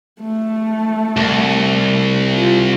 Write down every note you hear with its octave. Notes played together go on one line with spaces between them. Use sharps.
A3
C2
F4